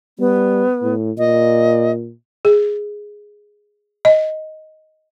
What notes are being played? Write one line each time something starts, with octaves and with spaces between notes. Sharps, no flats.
G3 B3
A2
A#2 D#5
G#4
D#5